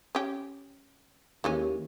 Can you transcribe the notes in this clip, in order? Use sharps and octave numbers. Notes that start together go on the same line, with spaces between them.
C#4 G4
D#2 E3 G#3 C#4